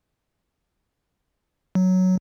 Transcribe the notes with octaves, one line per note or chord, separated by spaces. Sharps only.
F#3